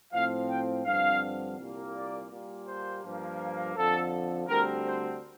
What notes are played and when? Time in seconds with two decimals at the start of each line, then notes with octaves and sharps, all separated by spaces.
0.13 A2 F3 C4 F5
0.49 G5
0.85 G2 D3 F3 C4 F5
1.58 C2 A#2 G3 A#3
1.94 D5
2.30 A#2 G3 A#3
2.67 C5
3.04 G2 F3 A#3
3.75 F2 D3 F3 A4
4.48 D2 D3 G3 C4 A#4
4.84 C5